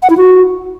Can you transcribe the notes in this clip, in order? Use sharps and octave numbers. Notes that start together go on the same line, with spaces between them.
F#5
E4
F#4